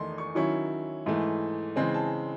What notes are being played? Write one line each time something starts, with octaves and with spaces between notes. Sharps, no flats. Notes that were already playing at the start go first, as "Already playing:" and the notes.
Already playing: E2 D#3 A3 D#4 C6
C#6
D#3 F#3 C#4 E4 C#6
G#2 E3 A3
C#3 E3 G#3 C4 C6
A5